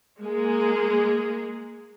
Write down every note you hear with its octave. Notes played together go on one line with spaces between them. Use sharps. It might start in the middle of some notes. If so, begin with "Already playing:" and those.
G#3 A#3 G#4